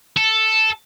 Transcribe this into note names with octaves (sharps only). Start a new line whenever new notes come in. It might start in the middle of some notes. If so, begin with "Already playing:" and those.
A4